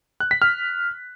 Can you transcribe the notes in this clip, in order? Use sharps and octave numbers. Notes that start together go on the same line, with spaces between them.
F#6
B6
F6